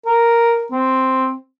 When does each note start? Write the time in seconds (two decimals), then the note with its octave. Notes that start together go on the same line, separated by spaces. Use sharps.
0.06 A#4
0.72 C4